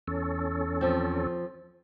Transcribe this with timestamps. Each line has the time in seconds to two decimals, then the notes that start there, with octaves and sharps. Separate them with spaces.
0.08 E2 C#4 A4
0.81 F3 C4